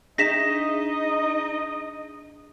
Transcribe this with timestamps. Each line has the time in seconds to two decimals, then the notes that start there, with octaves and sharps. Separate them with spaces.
0.18 D4 D#4 G#4 D#5 E5 A#6 B6 E7